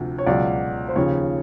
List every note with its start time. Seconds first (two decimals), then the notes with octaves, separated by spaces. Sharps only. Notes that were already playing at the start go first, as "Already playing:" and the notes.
Already playing: D2 C3 F3
0.18 C#5
0.26 C#2 B2 F#3 D5
0.89 C5
0.96 D#2 C#3 F3 C#5